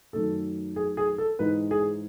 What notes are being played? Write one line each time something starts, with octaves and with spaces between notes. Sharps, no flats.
F#2 D#3 A3 A4
G#4
G#4
A4
G#2 E3 G#3 D#4 B4
G#4